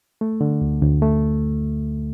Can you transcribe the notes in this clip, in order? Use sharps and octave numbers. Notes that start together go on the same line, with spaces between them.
A3
D3
D2
D2
A3